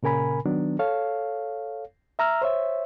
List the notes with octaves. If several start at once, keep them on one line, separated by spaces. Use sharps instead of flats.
A#2 C#3 A#4 G#5 B5
D#3 F#3 B3 D4
A4 C#5 F5
E5 A#5 E6 F6
C5 C#5 E5